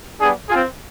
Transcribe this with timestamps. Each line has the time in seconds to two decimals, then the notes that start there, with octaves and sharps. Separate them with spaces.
0.20 G3 B3 D4 G#4
0.49 C4 F4 G#4